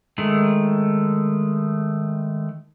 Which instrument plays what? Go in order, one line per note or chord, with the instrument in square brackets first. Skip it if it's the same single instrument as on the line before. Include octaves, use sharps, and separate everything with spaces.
[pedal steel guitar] D#3 G#3 A3